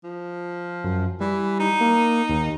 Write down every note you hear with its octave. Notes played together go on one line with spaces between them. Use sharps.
F3
F#2
E3 G3
D#4
A#3
D#2